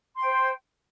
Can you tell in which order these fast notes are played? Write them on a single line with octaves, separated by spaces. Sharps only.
C6 G5 C5